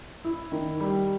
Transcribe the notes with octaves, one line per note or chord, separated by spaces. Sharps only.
E4
D#3
G3